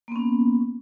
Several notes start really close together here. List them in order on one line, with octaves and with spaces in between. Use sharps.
A#3 B3 C#4